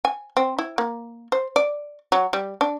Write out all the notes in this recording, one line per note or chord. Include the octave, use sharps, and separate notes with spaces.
G#5
C4
E4
A#3
C5
D5
F#3
G3
D4